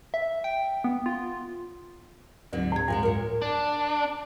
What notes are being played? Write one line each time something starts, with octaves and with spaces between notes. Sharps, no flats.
E5
G5
B3
F4
D2 G#2 D3 F#3
A2 G#6
G2 F3 F#3 G#3
A#4 C#5
D4